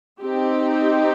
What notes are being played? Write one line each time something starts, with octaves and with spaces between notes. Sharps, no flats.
C4 D#4 G4